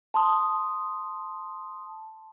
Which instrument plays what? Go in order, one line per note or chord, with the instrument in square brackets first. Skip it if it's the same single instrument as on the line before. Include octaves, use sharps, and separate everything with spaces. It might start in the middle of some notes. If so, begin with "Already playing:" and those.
[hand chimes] A5 C6 D#6